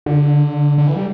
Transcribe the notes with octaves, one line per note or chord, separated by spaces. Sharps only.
D3
D3
E3
G3